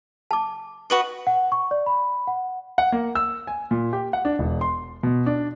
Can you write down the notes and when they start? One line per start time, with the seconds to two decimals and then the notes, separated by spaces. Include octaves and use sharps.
0.31 A5 D6
0.90 F#4 B4 D#5
1.27 F#5
1.52 C#6
1.71 D5
1.86 B5
2.27 F#5
2.78 F#5
2.92 A#3
3.15 E6
3.47 G#5
3.71 A#2
3.93 G4
4.13 F#5
4.25 D4
4.39 E1
4.61 C6
5.03 B2
5.26 D4